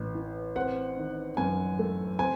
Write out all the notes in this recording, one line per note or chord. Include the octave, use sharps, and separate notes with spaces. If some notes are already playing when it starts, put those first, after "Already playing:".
Already playing: A1
E3
C4 F#5
D#3
F#2 G#5
A3
C4 G#5